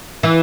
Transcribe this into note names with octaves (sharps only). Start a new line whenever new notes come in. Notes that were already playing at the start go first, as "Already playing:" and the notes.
E3